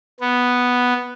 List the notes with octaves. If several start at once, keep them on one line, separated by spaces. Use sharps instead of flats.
B3